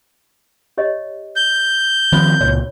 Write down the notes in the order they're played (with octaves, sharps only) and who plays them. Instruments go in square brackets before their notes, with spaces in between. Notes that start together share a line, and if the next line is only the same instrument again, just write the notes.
[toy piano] G4 C#5 D#5
[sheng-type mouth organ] G6
[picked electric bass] D#3 F3 C4 [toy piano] C5 B5
[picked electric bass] C#2 A#2 [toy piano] C#5